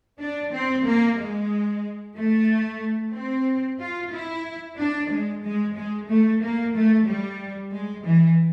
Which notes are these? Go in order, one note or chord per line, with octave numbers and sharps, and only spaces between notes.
D4
C4
A#3
G#3
A3
C4
F4
E4
D4
G#3
G#3
G#3
A3
A#3
A3
G3
G#3
E3